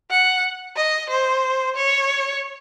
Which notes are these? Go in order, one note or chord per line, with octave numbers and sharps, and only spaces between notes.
F#5
D#5
C5
C#5